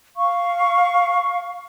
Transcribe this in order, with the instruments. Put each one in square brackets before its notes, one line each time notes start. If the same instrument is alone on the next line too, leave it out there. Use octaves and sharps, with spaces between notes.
[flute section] F5 C#6